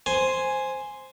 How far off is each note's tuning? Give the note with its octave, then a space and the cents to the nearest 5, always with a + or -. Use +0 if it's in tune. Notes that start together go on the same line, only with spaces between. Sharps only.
C5 +0 G#5 +0